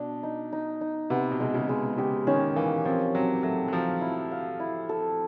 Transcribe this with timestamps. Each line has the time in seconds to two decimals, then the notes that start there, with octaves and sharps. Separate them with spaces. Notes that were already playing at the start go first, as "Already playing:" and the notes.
Already playing: B2 D4
0.23 D#4
0.53 D#4
0.81 D#4
1.10 C3 B3
1.31 B2
1.40 C3 G#3
1.54 C#3
1.69 G#3
1.98 C#3 G4
2.27 D#3 C#4
2.56 E3 A#3
2.85 F3 C4
3.15 F#3 C4
3.43 F#3 A3
3.68 F#3
3.72 F3 F5
4.01 E4
4.31 F5
4.60 E4
4.89 A4